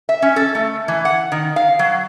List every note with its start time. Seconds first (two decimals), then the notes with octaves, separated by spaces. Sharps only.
0.09 E5
0.22 C#4
0.36 A4
0.55 A3
0.88 E3
1.05 F#5
1.32 D#3
1.56 F5
1.79 F#3